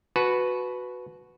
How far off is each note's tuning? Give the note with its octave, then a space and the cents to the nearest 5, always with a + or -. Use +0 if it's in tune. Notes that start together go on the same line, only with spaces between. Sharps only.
F#4 -5 B4 +0 A5 -35